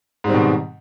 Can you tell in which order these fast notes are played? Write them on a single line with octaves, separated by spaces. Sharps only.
G#2 G3 C4 D#3 B2